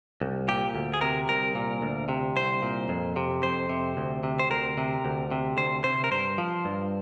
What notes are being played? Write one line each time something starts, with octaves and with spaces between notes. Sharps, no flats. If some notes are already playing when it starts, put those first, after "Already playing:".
C2
A#2 G4
D2
G#4
C3 A#4
C2 A#4
A#2
D2
C3
C2 C5
A#2
F2
C3
F2 C5
C3
D2
C3
C5
D2 A#4
C3
D2
C3
D2 C5
C3 C5
A#4
G2 C5
F3
G2